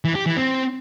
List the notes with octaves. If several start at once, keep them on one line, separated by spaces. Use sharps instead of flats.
E3
G4
E3
C4